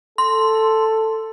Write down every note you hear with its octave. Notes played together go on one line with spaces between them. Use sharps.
A4 C6